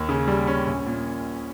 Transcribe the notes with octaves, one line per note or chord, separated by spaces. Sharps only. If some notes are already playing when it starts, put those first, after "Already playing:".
Already playing: D#2
C#3
G3
C#4
A#1
A#2